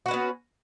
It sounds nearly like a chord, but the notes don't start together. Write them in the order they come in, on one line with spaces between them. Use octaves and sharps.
F#4 B4 C#4 B3